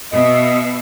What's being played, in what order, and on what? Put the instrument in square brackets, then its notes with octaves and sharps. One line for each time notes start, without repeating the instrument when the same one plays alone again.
[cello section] B2 E5 [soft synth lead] D#5